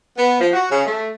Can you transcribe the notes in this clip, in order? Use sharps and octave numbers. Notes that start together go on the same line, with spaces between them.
B3
F3
F#4
C#3
A3